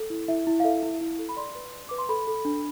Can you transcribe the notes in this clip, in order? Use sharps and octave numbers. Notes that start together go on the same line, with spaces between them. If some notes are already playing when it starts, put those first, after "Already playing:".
Already playing: A4
E4
E4 E5
E4
F5
A4 E5
E4
E4
A4
B5
D5 C6
B4
D5
B4 D6
C6
A4 B5
A4
D4